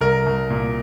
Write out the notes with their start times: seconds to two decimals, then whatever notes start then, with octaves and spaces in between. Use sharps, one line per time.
0.01 C2 A#4
0.26 C2
0.50 A#2